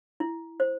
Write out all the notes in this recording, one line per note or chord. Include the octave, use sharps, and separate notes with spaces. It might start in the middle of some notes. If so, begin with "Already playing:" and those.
E4
C5